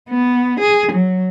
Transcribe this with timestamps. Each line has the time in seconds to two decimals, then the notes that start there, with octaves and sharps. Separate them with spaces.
0.10 B3
0.60 G#4
0.92 F#3